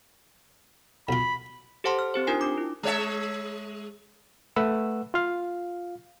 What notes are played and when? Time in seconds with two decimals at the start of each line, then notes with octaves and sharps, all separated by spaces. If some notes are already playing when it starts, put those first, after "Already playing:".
1.09 B1 F4 B5
1.84 G4 A4 C5 F#5 A5 C6
1.99 F6
2.14 C4 G4 C5
2.27 D4 D#4 F4 A#4 G#5 C7
2.41 D4 D6
2.58 E4
2.83 G#3 C#5 E5
4.56 A3 B4 F#5 E6
5.14 F4 F5